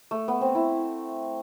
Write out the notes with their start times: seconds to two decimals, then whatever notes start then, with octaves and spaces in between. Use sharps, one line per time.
0.11 A3
0.28 B3
0.41 C4
0.55 E4